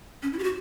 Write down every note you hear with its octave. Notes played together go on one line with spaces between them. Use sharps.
C#4
E4
G4
F#4